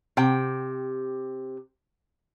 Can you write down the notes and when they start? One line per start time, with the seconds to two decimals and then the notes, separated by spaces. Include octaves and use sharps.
0.17 C3 G5